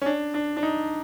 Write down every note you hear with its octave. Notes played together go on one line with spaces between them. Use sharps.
C#4
D4
D4
D4
D#4